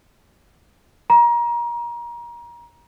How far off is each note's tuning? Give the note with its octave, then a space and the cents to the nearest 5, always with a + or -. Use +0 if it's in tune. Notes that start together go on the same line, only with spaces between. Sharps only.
A#5 +30